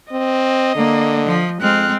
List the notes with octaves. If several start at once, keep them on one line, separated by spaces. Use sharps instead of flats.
C4 D#5
D3 A#3
F3
F2 G#3 C4 F6 F#6